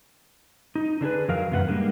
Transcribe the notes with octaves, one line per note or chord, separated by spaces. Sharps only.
D#4
D3 D4 G#4 B4
F2 D#3 F#3 A#4 F5
F#2 A2 C3 F4 B4 F#5
G3 G#3 A#3 D4